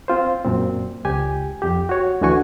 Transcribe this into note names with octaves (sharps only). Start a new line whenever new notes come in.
C4 F4 C5
F#2 A#2 C4
C#2 G4 G#5
F2 G4
F#4 C#5
D2 D3 E3 F#4 G#5 C#6